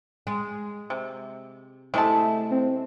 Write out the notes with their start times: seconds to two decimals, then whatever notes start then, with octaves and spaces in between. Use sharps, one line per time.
0.27 G#3
0.90 C3
1.94 C3 G#3 A3 E4 A5
2.51 C4